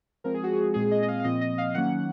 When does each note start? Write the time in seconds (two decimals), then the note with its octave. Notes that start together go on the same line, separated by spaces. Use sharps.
0.24 F3 G#3 C4 A#4
0.34 G#4
0.43 F#4
0.53 G#4
0.74 A#2 G#3 C4 G#4
0.91 D#5
1.03 D#5
1.08 F5
1.20 F5
1.24 A#2 F3 C4 D#5
1.41 D#5
1.58 F5
1.74 D#3 F#3 A#3 C#4 F#5